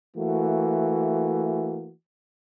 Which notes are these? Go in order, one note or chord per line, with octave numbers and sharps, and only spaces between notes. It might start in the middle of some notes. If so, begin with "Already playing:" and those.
E3 A3 A#3 F#4